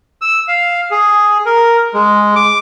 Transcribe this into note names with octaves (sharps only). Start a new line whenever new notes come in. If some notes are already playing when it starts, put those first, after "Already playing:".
E6
F5
G#4
A#4
G#3
D6